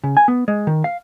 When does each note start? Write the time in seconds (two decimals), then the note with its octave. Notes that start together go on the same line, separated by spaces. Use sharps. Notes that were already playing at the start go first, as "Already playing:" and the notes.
0.04 C#3
0.17 G#5
0.28 B3
0.48 G#3
0.67 D#3
0.84 F5